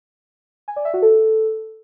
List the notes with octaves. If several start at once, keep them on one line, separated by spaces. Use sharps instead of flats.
G#5
D5
E5
F#4
A4